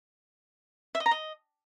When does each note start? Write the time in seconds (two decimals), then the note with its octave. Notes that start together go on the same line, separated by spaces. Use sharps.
0.95 E5
1.00 D#5
1.06 A#5
1.11 D#5